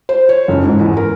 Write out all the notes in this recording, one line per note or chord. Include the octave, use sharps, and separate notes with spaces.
C5
C#5
F#1
G#2
E2
A#4